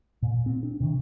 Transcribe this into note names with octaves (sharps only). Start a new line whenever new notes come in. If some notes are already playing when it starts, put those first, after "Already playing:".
A#2
C4
D4
C3 D#3